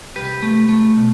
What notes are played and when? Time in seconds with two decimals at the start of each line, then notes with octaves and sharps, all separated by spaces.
0.16 C2 G4 B4
0.42 A3
0.69 A3
0.97 B2